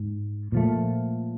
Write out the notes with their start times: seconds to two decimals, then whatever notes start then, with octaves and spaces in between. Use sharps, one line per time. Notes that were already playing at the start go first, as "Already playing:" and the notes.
Already playing: G#2
0.52 A#2 F3 A3